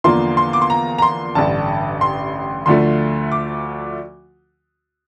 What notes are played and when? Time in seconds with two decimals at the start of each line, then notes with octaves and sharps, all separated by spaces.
0.04 E2 D3 F3 A#3 C6
0.37 C6
0.53 D6
0.62 C6
0.70 A#5
0.98 A#5
1.02 C6
1.35 A1 G2 D3 A5
2.01 C6
2.66 D2 D3 F3 A3 C6
3.32 D6